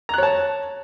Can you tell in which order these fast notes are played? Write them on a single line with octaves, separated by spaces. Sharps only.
A#5 F#6 C#5 A5